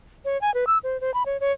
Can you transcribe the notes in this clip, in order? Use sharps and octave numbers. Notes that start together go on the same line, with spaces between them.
C#5
G#5
B4
E6
C5
C5
B5
C#5
C#5